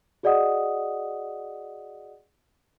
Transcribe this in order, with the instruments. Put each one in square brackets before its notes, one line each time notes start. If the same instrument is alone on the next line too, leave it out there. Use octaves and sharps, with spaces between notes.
[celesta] F#4 G#4 D5 D#5 F#5 D#6